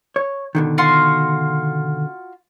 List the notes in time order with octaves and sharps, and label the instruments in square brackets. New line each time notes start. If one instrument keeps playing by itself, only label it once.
[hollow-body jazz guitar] C#5
B2 D3 D#3
[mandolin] F4 F#4 C6